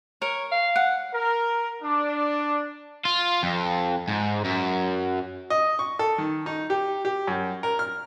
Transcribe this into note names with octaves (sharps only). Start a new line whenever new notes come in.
A#4 C#5
F5
F#5
A#4
D4
F4
F2
G#2
F#2
D#5
C#6
A4
D#3
D#4
G4
G4
F#2
A#4
F6